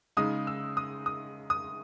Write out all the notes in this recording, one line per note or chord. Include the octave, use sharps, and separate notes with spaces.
C#3 G#3 D#4 D#6
E6
D#6
D#6
D#6